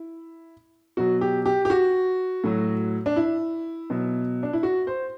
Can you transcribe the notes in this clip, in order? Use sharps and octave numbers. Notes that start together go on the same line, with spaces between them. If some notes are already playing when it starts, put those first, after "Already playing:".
Already playing: E4
B2 F#3 F#4
G4
G4
G4
F#4
A2 F#3
D4
E4
B2 F#3
D4
E4
F#4
C5